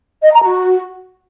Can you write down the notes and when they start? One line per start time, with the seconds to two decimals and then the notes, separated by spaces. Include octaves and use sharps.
0.23 D#5
0.33 A#5
0.43 F#4